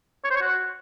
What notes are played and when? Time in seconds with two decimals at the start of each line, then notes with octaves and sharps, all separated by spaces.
0.25 C#5
0.30 C5
0.36 C#5
0.42 F#4